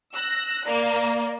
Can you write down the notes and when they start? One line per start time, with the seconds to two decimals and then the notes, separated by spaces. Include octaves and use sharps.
0.14 E6 F#6 A#6
0.65 A#3 D5